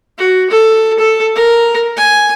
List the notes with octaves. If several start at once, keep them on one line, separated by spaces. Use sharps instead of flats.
F#4
A4
A4
A#4
G#5